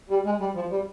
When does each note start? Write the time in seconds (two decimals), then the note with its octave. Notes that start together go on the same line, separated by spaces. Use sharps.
0.10 G3
0.25 G#3
0.40 G3
0.55 F3
0.71 G3